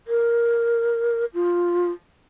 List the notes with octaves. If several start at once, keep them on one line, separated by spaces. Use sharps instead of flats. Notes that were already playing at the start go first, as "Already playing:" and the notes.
A#4
F4